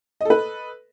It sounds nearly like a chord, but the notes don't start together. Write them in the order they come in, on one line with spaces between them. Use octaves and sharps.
D#5 A4 B4